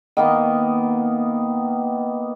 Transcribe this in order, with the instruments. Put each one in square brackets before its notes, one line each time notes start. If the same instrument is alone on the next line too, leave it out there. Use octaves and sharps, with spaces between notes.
[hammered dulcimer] D#3 A#3 B3